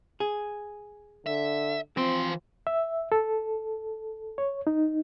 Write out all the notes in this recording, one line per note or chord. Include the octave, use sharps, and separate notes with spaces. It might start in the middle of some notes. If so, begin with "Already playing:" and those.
G#4
D3 E5
E3 F3 C4 C6
E5
A4
C#5
D#4